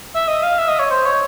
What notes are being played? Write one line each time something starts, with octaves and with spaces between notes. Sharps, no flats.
E5
D#5
F5
E5
D#5
C#5
C5
C#5